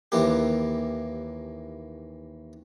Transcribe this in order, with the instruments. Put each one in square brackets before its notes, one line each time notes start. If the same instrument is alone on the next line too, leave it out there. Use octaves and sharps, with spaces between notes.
[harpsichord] D#2 E3 A#3 G4